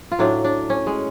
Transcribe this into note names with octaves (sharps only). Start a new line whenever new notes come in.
F4
A2 F#3 D4
D4
C#4
G#3